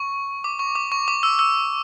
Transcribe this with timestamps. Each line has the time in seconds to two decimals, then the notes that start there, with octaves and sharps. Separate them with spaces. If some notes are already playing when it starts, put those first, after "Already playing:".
Already playing: C#6
0.44 D6
0.59 C#6
0.75 D6
0.92 C#6
1.08 D6
1.23 E6
1.39 E6